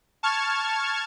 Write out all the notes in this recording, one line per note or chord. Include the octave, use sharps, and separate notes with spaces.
A5 C#6 F6 G#6